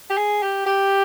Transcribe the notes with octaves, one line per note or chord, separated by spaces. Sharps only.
G4
G#4
G4
G4